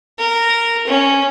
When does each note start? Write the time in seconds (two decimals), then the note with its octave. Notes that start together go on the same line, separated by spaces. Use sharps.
0.18 A#4
0.87 C#4